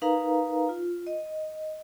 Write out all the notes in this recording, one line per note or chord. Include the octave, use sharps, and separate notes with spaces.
D#4 A#4 B4 F5 A#5
F4
D#5